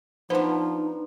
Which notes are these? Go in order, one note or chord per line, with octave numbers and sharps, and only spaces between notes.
F3 B3 D4 D#4 C5